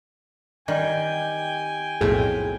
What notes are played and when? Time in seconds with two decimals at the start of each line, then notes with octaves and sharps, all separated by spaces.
0.68 D#3 G3 G5 G#5
2.01 B1 F2 A2 G#4